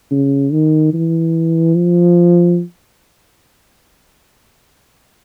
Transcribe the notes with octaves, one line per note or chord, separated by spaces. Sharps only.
C#3
D#3
E3
F3